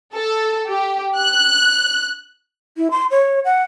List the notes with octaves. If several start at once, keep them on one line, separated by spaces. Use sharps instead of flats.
A4
G4
F#6
E4
C6
C#5
F#5